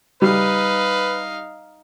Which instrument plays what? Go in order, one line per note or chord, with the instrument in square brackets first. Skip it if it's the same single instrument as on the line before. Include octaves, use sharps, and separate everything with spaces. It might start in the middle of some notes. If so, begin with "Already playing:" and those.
[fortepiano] G3 [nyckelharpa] D#4 F5 [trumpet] B4